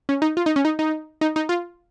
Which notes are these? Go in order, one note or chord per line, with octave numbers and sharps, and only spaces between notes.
C#4
D#4
F4
D#4
C#4
D#4
D#4
D#4
D#4
F4